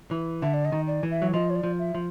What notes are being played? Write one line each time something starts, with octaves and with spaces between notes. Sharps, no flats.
E3
D3 E5
D5
D#5
D#3
D5
E3
E5
F#3
F3 D#5
C#5
D5
F3
E5
F3